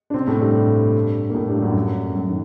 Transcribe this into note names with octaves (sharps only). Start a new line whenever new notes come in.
D4
C3 C4
A2 A3
G2 G3
A#3
A2 A3
G2 G3
F#2 F#3
F#2 F#3
D#3